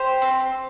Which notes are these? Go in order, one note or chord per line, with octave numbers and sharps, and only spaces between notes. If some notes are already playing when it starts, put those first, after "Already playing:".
Already playing: G4 C5
C4